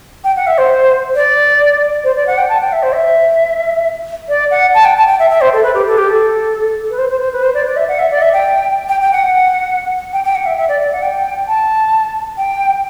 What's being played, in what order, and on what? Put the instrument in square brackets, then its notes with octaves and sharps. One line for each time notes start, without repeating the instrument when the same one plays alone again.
[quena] G5
F#5
E5
C5
D5
C5
D5
F#5
G5
A5
G5
E5
C5
E5
D5
F#5
A5
G5
A5
G5
E5
E5
C5
A4
B4
G4
A4
G4
A4
B4
C5
C5
C5
B4
C5
D5
D5
E5
F#5
E5
D5
E5
G5
G5
G5
F#5
G5
G5
F#5
E5
E5
D5
D5
F#5
G5
A5
G5